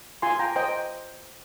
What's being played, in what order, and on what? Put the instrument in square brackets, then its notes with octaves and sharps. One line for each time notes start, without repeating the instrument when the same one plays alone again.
[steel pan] F4 G#5 C6
G5 A#5
C5 D#5 G5